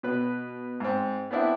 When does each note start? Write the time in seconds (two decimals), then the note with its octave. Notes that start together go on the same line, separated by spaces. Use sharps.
0.03 B2 B4
0.80 G#2 C4
1.31 B3 C4 D4 E4